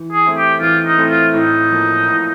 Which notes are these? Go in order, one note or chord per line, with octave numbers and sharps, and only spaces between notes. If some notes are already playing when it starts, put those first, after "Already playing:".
Already playing: E3
G#4
A3 C4 E4
G4
E3 F4
D#4
A3 C4 E4
F4
A2 D#4
F3 A#3
A2